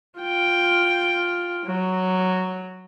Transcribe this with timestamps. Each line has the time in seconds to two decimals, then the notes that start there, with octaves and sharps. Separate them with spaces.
0.18 F4 G5
1.66 F#3